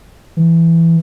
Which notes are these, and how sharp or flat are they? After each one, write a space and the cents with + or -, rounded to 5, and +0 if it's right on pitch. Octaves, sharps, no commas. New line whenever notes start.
E3 +10